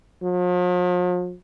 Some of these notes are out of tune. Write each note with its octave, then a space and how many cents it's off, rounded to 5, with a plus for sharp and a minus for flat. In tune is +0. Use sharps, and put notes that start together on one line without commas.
F3 +45